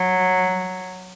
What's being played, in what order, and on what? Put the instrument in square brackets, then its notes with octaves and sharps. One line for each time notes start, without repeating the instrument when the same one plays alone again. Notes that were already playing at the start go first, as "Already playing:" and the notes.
Already playing: [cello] F#3